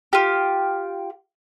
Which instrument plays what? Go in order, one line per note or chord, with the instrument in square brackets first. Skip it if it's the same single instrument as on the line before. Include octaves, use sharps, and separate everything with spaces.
[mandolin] F4 G4